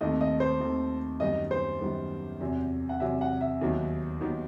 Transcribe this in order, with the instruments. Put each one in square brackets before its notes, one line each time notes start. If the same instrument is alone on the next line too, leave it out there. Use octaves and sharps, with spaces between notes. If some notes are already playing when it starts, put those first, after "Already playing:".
[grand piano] D#2 D#3 A3 C4 D#4 [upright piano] D#5
[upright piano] D#5
C5
[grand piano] D#2 D#3 A3 C4 D#4
[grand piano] F#2 D#3 G3 B3 D#4 [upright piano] D#5
[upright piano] C5
[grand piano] F#2 D#3 G3 B3 D#4
E2 C3 F#3
[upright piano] F#5
[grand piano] E2 C3 F#3 [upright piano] E5
[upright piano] F#5
E5
[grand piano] D#2 D#3 F#3 B3 D#4
D#2 D#3 F#3 B3 D#4